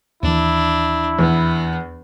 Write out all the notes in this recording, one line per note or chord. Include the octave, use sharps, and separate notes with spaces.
D#2 E3 D4 E4
E2 B3